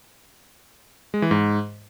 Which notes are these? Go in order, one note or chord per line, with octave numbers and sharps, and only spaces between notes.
G#3
E3
G#2